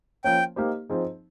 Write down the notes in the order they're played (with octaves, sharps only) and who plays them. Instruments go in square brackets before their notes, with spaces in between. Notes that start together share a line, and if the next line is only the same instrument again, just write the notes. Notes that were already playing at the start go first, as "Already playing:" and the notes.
[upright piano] F3 A#3 C#4 [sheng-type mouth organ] G5
[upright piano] A#3 D#4 G4 C5
F3 C4 D#4 G#4